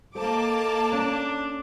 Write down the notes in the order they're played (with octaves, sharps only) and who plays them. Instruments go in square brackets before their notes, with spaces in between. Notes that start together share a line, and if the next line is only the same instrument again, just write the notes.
[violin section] A#3 A5 D6 [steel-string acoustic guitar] A4 C5 D#5
[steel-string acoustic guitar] C#4 [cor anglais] D4